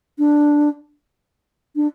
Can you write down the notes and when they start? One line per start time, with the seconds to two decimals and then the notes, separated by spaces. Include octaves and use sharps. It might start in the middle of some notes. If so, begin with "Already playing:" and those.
0.19 D4
1.76 D4